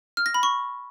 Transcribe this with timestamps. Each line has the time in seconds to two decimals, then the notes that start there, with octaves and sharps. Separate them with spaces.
0.17 F6
0.26 A#6
0.34 B5
0.43 C#6